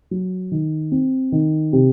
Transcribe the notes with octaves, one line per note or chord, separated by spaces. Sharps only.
F#3
D#3
C4
D#3
C3